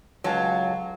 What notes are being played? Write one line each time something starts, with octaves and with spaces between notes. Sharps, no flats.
C#2 F#3 F4 A4 F5 G#5 A5